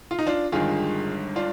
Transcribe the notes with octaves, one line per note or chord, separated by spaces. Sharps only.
F4
D#4
D4 F4
G1 G2 D#3 G#3 F4 G#4
D4 F4